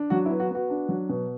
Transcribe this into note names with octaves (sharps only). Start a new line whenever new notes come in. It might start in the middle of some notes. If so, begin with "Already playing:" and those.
Already playing: D4
F#3 F#4
E4
B3
F#4
B3 F#4
D4
F#3
B2